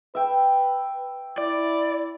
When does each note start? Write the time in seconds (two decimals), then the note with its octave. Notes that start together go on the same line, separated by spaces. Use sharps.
0.15 B4 E5 G5
1.38 E4 D5